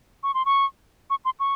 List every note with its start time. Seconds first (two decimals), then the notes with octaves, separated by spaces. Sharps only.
0.23 C#6
0.34 C6
0.46 C#6
1.10 C#6
1.25 C6
1.40 C#6